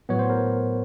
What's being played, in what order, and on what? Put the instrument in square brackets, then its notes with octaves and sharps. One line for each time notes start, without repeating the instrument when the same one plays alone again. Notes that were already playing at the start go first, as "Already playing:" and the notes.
[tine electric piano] A2 F#3 B3 C#5
C5
A#4